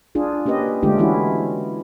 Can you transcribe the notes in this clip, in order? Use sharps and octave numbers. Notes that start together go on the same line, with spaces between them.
D4 F4 G#4
A#3 C#4 G4 B4 D#5
D3 G#3 A3 D4 F4 G4
E3 G#3 C#4 E4 F#4